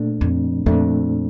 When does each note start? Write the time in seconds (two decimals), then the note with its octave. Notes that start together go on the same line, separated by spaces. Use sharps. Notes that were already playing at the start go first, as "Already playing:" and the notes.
Already playing: A#2 A3 D4
0.21 F2
0.66 F2 A#2 A3 D4